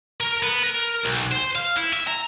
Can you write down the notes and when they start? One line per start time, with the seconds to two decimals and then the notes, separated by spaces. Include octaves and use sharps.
0.20 A#4
0.42 B3
0.63 A#4
1.03 B1
1.31 C5
1.56 F5
1.77 E4
1.93 E5
2.08 A#5